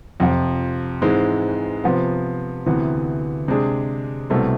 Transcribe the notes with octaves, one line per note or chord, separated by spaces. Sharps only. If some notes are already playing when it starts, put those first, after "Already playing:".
F2 C3 F3
G#2 E3 G#3 C4
C3 F3 B3
D2 C3 E3 B3
C3 G#3 D4 G#4
C2 B2 A3 C4